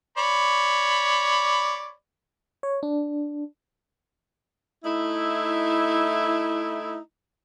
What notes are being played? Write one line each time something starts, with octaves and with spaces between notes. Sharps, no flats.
C#5 D5 B5
C#5
D4
A3 D#4 E4